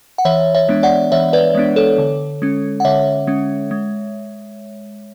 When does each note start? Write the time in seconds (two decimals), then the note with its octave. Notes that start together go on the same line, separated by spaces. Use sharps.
0.18 F#5
0.25 E3 C#5 E5
0.54 C#5 E5
0.68 G#3 B3 D4
0.83 D5 F#5
1.12 E3 C#5 E5
1.33 B4 D5
1.55 G#3 B3 D4
1.76 A4 C#5
1.98 D3
2.42 G#3 C#4
2.80 F#5
2.85 D3 C#5 E5
3.27 G#3 C#4
3.71 G#3